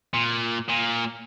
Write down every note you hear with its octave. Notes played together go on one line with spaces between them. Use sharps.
A#2
A#2